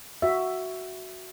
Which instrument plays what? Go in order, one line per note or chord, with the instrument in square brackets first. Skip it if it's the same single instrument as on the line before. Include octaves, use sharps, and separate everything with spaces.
[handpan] F#4 E5